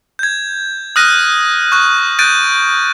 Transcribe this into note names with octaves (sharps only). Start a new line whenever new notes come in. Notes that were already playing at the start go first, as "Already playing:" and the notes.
G6 G#6
D#6 F6 F#6 A#6 D#7
C#6 F#6
F#6 G6 A6 D7 D#7